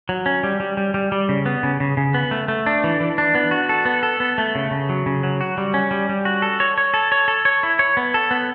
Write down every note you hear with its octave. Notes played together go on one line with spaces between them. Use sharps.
F#3
C#4
G3
G3
G3
G3
G3
C#3
B3
C#3
C#3
C#3
B3
A3
A3
D4
E3
E3
D4
B3
F#4
A4
B3
A4
B3
A3
C#3
C#3
F#3
C#3
F#3
F#4
G3
C#4
G3
G3
F#4
A4
C#5
C#5
A4
C#5
A4
C#5
E4
C#5
B3
A4
B3